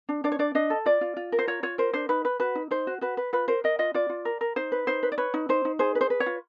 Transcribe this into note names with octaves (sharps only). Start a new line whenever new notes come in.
D4
D4 D5
C#5
D4 D5
D4 D#5
A4
F4 D5
F4
F4
A#4
C5
F4 C#5
F4 C#5
A#4 C5
D4 C5
D#4 B4
B4
F#4 B4
D#4
D#4 C5
F#4
F#4 B4
B4
F4 B4
A#4 C5
A#4 D#5
F4 D#5
F4 D5
F4
A#4
A#4
D#4 C5
B4
D#4 C5
B4
D5
B4 C#5
D#4
D#4 C5
D#4
G#4 C5
B4
C5
B4
C#5
F4